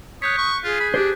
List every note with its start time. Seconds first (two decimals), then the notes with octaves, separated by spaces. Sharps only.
0.22 C#5 D#6 F#6 G6 B6
0.38 C#6
0.64 F4 G#4
0.80 B5
0.94 D4 G4 C5